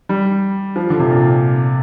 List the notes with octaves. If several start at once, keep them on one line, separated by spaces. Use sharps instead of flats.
G3
F3
D3
C3
A#2